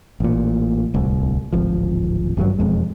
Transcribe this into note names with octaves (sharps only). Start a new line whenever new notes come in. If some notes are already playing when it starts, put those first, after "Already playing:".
A1 A#2
D1 C2
D1 G#1 F3
G#1 G2 F3 F#3
E1 F2 G#3